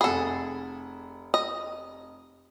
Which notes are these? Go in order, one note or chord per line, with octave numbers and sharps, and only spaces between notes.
F1 G#4 A4 F#5 B5
D#5